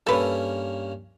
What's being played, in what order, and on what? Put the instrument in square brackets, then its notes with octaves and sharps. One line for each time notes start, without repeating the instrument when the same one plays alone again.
[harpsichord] G2 A#3 C#4 [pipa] A4 B4